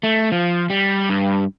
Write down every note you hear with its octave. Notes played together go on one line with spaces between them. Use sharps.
A3
F3
G3
G2